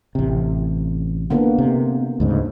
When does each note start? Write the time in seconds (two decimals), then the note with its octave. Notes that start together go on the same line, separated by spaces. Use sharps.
0.15 A1 C3
1.30 D3 A#3 B3
1.58 C3
2.20 D2 G#2 C#3